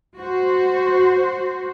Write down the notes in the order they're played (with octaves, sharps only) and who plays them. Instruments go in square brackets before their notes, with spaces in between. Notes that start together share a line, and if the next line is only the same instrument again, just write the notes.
[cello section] F#4 C5